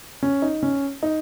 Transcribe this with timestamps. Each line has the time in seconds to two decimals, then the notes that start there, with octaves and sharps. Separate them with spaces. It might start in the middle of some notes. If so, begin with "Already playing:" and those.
0.23 C#4
0.42 D#4
0.63 C#4
1.03 D#4